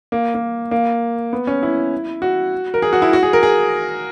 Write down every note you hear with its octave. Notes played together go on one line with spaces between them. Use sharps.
A#3
A#3
A#3
B3
C#4
E4
F#4
A#4
G#4
F#4
E4
F#4
G#4
A#4
G#4